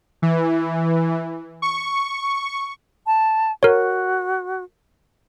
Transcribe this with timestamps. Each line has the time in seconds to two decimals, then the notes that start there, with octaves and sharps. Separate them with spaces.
0.22 E3
1.62 C#6
3.07 A5
3.63 F#4 A#4 C#5